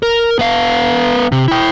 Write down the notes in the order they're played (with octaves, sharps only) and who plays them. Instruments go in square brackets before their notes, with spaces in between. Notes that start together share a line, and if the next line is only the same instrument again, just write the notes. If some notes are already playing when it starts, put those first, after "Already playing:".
[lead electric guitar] A#4
B3 F5
C3
E4 G5